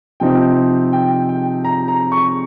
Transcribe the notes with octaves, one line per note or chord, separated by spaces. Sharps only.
C3 F3 C4 D#4 G5
G5
G5
A#5
A#5
C#6